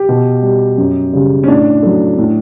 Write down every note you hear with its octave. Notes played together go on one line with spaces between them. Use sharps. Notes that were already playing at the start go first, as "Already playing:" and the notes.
Already playing: G4
B2
G3
F#2
C#3 G3
C#4
A2 D4
F#3 A3
A2